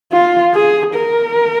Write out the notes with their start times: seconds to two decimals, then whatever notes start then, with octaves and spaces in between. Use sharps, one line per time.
0.12 F4
0.54 G#4
0.95 A#4